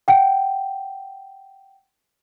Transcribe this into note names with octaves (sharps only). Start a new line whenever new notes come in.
F#5 G5